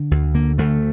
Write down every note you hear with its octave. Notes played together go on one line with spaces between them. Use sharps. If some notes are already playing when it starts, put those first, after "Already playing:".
Already playing: D3
D2
D3 A#3
D2 A3